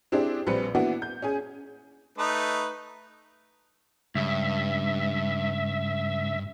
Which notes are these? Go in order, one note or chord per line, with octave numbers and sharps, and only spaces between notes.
C4 D4 E4 G4 G#4 C5
A#1 G3 C4 B4 C#7
E3 A#3 B3 D4 E4 F#4
G6
C#4 G#4 G#5
A3 D#4 B4
C#2 G2 E5